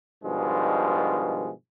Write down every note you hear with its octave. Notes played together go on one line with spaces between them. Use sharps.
G2 B2 D#3 F3 G#3